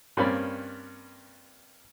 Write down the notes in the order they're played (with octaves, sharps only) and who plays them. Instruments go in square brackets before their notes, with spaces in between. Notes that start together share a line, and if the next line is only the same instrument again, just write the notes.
[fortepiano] G2 A#3 C4 C#4 D5 B5